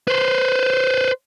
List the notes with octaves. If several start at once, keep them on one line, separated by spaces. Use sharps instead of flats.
B4 C5